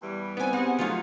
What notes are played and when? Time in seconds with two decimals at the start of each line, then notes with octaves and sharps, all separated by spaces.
0.02 E2 E3 G3
0.37 B3 C4 D#4 G#5
0.53 C4 G4 G#4 F#5
0.79 F3 F#3 A3 D#4 F4